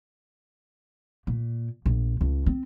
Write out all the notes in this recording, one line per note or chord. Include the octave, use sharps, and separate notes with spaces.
A#2
A#1
C#2
C4